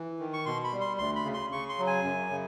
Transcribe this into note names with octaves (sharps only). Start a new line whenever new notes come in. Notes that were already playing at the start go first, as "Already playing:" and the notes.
Already playing: E3
D#3
C#6
B2 C6
B5
G3
C6
D2 C6
B5
C#3
C6
C#3 C#6
C6
F#3
G#5
F#2
C#3